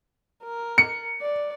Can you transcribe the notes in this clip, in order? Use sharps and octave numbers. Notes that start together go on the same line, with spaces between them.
A#4
C#7
D5